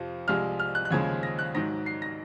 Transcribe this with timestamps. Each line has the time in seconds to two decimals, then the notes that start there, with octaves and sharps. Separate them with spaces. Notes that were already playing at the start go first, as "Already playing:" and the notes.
Already playing: F2 C3 F3
0.28 C2 C3 F3 G#3 F6
0.59 F6
0.75 F#6
0.85 F#6
0.91 D#2 C#3 F3 G#3 G#6
1.23 A#6
1.39 F#6
1.55 G#2 D#3 F#3 A#6
1.86 C7
2.02 A#6